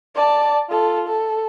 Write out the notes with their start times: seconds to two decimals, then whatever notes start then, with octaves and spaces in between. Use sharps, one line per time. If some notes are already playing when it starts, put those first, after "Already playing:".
0.15 D5 A5
0.69 F4 A4
1.07 A4